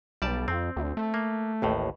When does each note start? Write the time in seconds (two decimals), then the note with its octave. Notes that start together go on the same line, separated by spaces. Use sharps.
0.22 B1 G3 D5 A5
0.48 F2 C4
0.76 D2
0.97 A3
1.14 A#3
1.62 A1 D#2 A2